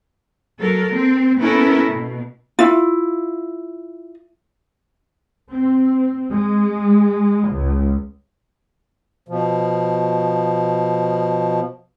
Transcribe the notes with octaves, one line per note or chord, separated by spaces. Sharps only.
F#3 A4 A#4
C4
B3 C#4 E4 A4 A#4
B2
E4 F4
C4
G#3
C#2
B2 F3